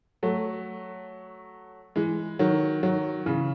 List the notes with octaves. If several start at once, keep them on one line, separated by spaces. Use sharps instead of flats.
F#3 A3
E3 G#3
D#3 F#3
D#3 F#3
C#3 E3